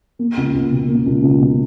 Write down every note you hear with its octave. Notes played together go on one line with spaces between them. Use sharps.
A#3
C#2
C#2
B2
A#3
C#2
C#2
B2